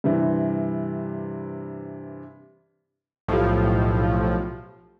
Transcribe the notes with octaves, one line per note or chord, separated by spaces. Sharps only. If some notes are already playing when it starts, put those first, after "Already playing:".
G2 C3 E3
B1 A2 F3 F4 G4